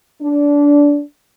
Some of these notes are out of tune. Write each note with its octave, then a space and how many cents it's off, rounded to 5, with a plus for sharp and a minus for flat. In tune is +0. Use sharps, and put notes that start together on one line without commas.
D4 -20